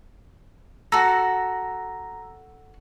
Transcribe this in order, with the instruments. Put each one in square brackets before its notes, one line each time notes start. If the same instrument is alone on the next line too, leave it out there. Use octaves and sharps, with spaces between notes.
[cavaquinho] F#4 A4 [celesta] A#5 E6 A#6